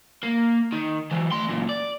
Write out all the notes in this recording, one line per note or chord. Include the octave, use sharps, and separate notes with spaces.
A#3
D#3
E3 F#3
A3 C6
F#2 A#2
D5